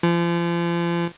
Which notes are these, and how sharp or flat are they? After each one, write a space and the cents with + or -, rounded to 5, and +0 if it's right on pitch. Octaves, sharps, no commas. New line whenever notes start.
F3 -35